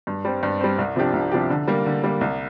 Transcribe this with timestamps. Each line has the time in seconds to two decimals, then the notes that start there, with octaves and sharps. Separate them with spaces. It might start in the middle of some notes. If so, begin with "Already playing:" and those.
0.07 G2
0.25 G3 C4
0.43 G2
0.61 G3 C4
0.78 C2
0.96 C3 F3 D4 G4
1.13 C2
1.32 C3 F3 D4 G4
1.50 D3
1.68 G3 A#3
1.86 D3
2.04 G3 A#3
2.21 C2